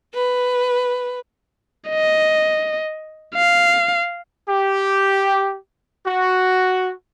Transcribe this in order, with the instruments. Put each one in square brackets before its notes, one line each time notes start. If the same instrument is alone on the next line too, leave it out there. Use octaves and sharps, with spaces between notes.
[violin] B4
[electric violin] D#5
F5
[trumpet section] G4
F#4